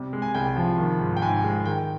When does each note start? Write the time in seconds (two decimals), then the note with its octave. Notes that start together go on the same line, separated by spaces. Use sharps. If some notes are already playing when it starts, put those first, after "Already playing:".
Already playing: C3 G3
0.13 G#3
0.22 G#5
0.34 C2 G5
0.57 F3
0.78 D#3
1.00 G#2
1.17 G5
1.22 G#2 G#5
1.44 G#3
1.66 D#3 G5